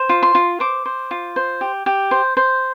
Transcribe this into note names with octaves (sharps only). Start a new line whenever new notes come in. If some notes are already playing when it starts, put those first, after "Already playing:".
Already playing: C5
F4
C6
F4
C5 D6
C5
F4
C5
G4
G4
C5
C5